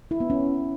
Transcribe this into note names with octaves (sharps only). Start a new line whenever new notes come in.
E4
B3
C#4